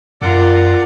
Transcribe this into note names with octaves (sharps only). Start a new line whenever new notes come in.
F#2 F4 A#4 D5 F#5 D6